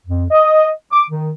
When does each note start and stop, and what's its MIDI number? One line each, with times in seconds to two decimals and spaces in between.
0.06 0.24 41
0.30 0.69 75
0.92 1.03 86
1.11 1.31 51